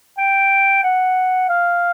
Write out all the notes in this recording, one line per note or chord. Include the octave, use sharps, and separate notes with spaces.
G5
F#5
F5